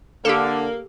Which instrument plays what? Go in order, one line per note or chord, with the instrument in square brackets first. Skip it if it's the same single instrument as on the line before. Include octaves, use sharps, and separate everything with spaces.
[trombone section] D3 [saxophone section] A#3 [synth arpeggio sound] G4 A4